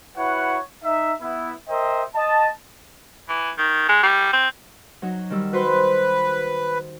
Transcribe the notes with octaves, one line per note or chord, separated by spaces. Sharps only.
E4 F#4 B4 C#5 F#5
D#4 E5
B3 E4
A#4 C5 D#5 E5 G5
D#5 A5
E3
D#3
G#3
G3
C4
F#3 D#4 F#4
D#3 G3 E6
F#4 B4 C5 C6